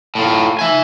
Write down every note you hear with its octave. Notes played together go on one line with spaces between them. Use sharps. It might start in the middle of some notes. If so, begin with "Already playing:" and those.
A2 F4
E5 G#5